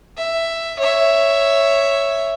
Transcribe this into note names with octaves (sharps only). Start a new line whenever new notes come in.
E5
C#5 E5